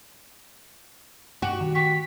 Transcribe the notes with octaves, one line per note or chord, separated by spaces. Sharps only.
G2 F#4 G4
D#3
G4 C#6 B6